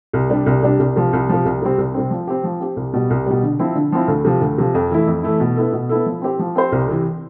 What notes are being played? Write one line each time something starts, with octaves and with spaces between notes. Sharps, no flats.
C2
C3 G3 D4
C2
C3 G3 D4
C2
C3 F3
C2
C3 F3
C2
C3 G3 C4
C2
C3 G3 C4
F3
C4 G4
F3
C4 G4
C2
B2 G3
C2
B2 G3
D3
F3 C4 E4
D3
F3 C4 E4
D2
C3 F3
D2
C3 F3
F2
E3 A3 E4
F2
E3 A3 E4
B2
B3 E4 A4
B2
B3 E4 A4
F3
C4 G4 C5
F3
C4 G4 C5
C2
C3 E3